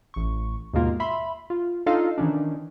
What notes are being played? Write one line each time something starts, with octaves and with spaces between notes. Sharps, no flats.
A1 C#6
D#2 G#2 B2 G#3 A#3 F4
E5 B5 C6
F4
D4 D#4 F4 A4 D#5 F5
D#3 E3 C#4 D4